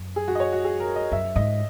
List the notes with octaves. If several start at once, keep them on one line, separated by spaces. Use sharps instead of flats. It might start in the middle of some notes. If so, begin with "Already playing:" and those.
Already playing: F#2
G#4
F#4
D#5
C#5
F#4
G#4
A#4
D#5
F#2 E5
G#2 D#5